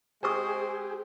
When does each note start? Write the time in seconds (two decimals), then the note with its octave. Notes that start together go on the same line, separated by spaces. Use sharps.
0.23 G#3 C4 G4 G#4 C5 G#5 C#6 D#6